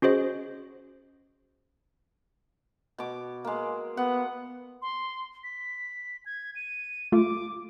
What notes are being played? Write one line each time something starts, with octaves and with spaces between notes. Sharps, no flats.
C#4 F#4 G#4 C5 D#5
B2 D6
G#3 A#3
B3 F#5
C6
B6
G#6
D#7
A3 F4 D6